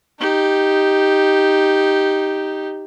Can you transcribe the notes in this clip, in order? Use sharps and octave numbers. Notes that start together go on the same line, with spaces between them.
D#4 G4